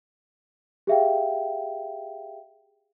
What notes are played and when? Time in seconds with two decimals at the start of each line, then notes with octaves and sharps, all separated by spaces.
0.87 G4 G#4 E5 F5 G5